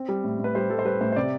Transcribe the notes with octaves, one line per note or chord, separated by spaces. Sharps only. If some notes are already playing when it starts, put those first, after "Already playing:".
Already playing: C4
G3
A2
A2
B4
G3 C5
G3 A4
C5
G3 B4
A2 C5
C5
C3 D5